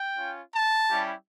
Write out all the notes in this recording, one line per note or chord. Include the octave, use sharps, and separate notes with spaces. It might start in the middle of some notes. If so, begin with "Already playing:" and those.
Already playing: G5
C#4 F4
A5
G3 C#4 E4 G4